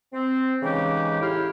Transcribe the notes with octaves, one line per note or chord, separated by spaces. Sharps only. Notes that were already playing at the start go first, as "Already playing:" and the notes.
C4
C#3 E3 G#3 D#4 G4
A2 E4 G4 F5